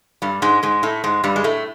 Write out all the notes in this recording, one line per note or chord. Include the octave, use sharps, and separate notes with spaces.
G2 G3
G#2 G#3
G#2 G#3
A2 A3
G#2 G#3
G2 G3
G#3
A2 A3